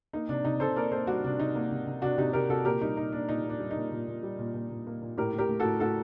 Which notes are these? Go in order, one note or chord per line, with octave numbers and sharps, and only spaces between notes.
A#3 D#4
C3 D4
C3 D#4
C3 A4 C5
A#3 A#4 D5
A#3 A4 C5
G3 D4 F#4
C3 D4
C3 D#4
A#3
C3
C3
C3 D4 F#4
C3 D#4 G4
C3 G4 A#4
C3 F#4 A4
A#2 G4 A#4
G3 D#4 G4
A#2 D#4
A#3 D4
A#2 D#4
A#3
D4
G3
D#4
A#2
A#2
A#2
G3
A#2
A#2
A#2
A#3
A#2
A2 G4 A#4
A2
G4 A#4
A3
A2 F#4 A4
A2 F#4 A4